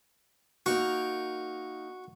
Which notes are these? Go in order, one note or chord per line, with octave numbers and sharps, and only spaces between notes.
A#3 D#4 F#4 A#4